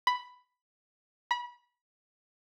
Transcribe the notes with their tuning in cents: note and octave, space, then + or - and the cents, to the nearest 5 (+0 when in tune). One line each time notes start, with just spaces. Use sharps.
B5 +5
B5 -30